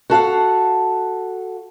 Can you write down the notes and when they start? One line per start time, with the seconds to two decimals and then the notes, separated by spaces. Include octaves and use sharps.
0.10 F#4 A4 F5 F#5